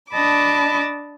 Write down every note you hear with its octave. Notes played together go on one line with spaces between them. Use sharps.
D4 D#5 A5 B5 D6